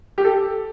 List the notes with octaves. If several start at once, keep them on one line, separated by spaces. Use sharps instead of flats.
G4
A4